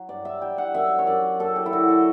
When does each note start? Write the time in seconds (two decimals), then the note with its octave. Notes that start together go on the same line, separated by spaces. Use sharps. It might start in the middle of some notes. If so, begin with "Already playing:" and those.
Already playing: F#3
0.09 G2 D5
0.25 E5
0.41 G3 G5
0.58 F#5
0.74 F#2 E5
0.99 C#5
1.07 F#2 D5
1.39 F#2 A4
1.56 G4
1.66 E4
1.73 D3 F#4
1.88 A4